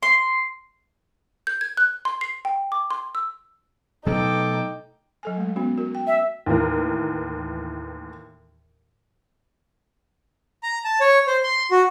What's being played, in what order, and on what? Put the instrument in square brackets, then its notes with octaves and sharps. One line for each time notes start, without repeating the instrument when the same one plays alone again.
[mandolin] C6
[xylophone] G6
G#6
F#6
C6
C7
G5
D6
C6
E6
[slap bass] B2 F#3 A3 [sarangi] D#4 [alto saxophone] A4 [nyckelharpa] G5 D6
[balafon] F#3 A4 G#5
G#3 A3
B3 C#4 F#4
F#4 A#4
G5
[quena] E5
[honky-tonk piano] D#2 A2 E3 A#4
[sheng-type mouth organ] A#5
A5
C#5
C5
C6
F#4